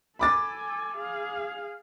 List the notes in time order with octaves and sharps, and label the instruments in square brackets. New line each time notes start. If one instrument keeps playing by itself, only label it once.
[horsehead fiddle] A4 G#5 [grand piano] B5 D6 A6
[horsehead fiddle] G#4 F5